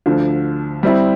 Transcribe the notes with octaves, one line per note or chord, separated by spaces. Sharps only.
D2 D3 F3
G3 C4 E4